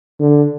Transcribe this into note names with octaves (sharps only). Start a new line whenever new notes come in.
D3